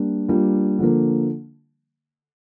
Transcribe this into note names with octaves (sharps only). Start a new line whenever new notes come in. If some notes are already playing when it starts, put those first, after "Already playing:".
Already playing: G3 A#3 D4
G3 A#3 D4 F4
D3 F3 A#3